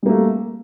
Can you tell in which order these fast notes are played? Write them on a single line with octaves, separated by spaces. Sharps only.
G3 A#3 A3